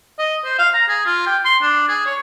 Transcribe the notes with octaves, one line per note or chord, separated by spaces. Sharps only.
D#5
C5
F5
A#5
G#4
F4
G5
C6
D4
G#4
C#5